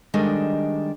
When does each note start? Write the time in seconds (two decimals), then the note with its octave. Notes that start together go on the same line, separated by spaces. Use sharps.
0.14 D#3 G3 G#3 D4 A4 D#5